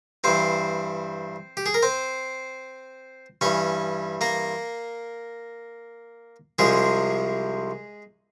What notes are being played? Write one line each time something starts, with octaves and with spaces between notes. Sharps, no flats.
G2 E3 C4 C5
G4
G#4
A#4
C4 C5
G2 E3 C#4 C#5
A#3 A#4
C2 C3 F3 G#3 G#4